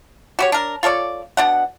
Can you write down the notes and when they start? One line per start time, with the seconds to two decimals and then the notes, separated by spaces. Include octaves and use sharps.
0.39 F#4 G4 C#5
0.52 D4 A#4
0.83 F4 A4 C#5 D5
1.37 B2 D4 F#5